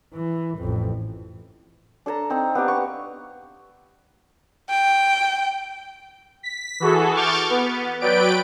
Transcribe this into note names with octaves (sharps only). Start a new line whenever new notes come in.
E3
A1 F2
D4 A4 A5 A#5
C4 D#4 A#5
B3 D4 G4 F5
C#6
G5
B6
E3 F#4 G#4 A4
C#6 D6 F6 G6 A6
B3
F#3 B4 D5 G5 D7